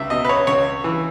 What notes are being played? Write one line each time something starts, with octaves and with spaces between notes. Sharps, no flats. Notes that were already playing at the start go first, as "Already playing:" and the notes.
Already playing: C#2 E5
B2 D#5
B4
C#5
C#2 C#5
E3